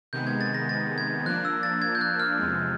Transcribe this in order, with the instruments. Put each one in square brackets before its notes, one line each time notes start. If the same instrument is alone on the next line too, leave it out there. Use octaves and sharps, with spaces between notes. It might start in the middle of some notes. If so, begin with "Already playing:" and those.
[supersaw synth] C3 D#3 G#3 B3 [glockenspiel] G6
[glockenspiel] G#6
A6
A#6
A6
G#6
[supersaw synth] F3 A#3 D4 [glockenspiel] F#6
[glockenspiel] E6
A6
G#6
G6
F#6
F6
[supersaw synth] E2 C3 F3 G#3